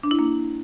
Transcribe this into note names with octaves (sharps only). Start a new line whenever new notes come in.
D4
E4
A#3